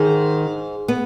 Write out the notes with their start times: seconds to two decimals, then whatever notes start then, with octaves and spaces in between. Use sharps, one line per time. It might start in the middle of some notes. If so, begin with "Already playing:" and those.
Already playing: G#2 D#3
0.88 B3